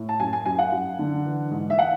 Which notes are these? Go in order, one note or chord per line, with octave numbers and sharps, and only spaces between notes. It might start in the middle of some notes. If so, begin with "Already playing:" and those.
Already playing: A2
A5
F#2 G#5
G#5
F#2 G#5
F#5
F#2
D3
E3
G#2
E5
F#5